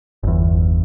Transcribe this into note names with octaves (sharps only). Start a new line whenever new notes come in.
G1 E2